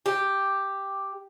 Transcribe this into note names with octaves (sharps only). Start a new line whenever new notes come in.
G4